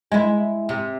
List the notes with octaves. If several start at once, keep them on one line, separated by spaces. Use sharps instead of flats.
G#3 E4
C3